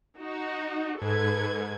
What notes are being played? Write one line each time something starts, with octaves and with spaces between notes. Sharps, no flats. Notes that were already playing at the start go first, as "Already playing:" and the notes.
D#4 F#4
G#2 A4 B4 G#6